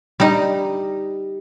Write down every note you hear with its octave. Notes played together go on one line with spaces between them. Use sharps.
G3 D#4